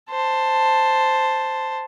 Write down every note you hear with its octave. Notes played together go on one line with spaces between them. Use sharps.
C5 A5